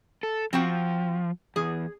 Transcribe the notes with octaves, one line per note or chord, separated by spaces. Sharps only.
A4
F3 C4 F#4 G5
E2 G#4